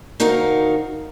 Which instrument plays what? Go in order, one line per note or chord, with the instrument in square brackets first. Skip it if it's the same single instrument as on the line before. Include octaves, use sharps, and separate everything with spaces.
[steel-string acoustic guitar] D2 D#4 F#4 A#4 F5